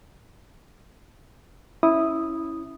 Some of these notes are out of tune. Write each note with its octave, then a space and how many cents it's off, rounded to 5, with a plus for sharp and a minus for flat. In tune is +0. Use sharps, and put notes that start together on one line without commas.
C#4 +0 E4 -10 D#6 -5